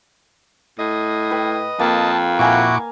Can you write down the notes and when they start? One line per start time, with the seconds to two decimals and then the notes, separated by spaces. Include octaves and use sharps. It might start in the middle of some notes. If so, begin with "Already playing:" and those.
0.79 A2 D#5
1.30 B4 G5
1.80 F2 A#3 A5
2.39 A#2 E4 F#4 F5 G#5 A#5 C#6 D6